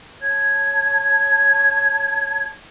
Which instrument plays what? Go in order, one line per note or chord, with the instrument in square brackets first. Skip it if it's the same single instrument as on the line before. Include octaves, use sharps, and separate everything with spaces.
[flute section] C#5 A5 G#6